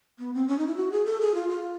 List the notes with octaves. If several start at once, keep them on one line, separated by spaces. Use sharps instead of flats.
B3
C4
C#4
D#4
E4
F#4
G#4
A4
G#4
F4
F4